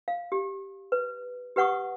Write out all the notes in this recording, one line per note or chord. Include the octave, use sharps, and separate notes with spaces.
F5
G4
B4
G4 B4 F#5 C#6 D#6